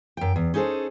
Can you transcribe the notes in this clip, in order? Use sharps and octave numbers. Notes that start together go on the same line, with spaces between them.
F#2 G5
E2
C#4 D#4 G#4 A4 C5